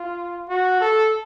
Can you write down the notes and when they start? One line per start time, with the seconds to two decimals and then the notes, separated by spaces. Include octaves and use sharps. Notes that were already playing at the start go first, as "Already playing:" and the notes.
Already playing: F4
0.49 F#4
0.81 A4